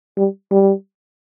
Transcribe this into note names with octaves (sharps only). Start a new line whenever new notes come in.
G3
G3